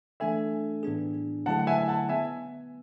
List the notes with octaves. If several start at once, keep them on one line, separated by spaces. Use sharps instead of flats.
E3 A3 D4 A4 E5 G#5
A2 E3 B3 D4 G#4
D3 F#3 A3 E4 G#4 F#5 A5
F#5
E5 G#5
G#5
F#5 A5
B3 E5 G#5